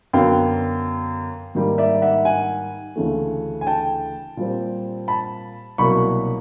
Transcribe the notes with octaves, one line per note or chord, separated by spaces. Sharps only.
F#2 D3 F#3 B3 F5 G5
G#2 D#3 G3 A#3 D#4
D5 E5
E5 F#5
F#5 G#5
D2 C#3 E3 A3
G#5
G5 A5
A#2 G3 C4
A5 B5
C2 B2 F#3 A#3 B5 C#6